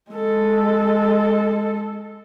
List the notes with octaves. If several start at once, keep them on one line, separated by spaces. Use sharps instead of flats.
G#3 A4